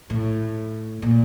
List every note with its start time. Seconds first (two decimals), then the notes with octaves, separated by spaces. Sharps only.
0.10 A2
1.02 A#2